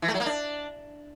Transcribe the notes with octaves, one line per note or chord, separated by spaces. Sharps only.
E3
A3
F#3
A#3
D4